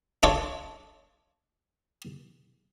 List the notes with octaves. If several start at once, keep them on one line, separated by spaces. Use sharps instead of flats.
D4 F4 A4 C#5